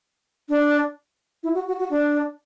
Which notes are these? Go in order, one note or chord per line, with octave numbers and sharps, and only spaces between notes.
D4
E4
F#4
F#4
F#4
D4